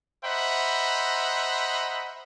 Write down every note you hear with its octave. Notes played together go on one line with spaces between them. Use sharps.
C5 D#5 E5 F#5 A#5 B5